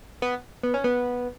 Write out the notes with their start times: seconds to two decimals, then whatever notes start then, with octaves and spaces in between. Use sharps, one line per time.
0.22 B3
0.63 B3
0.74 C#4
0.84 B3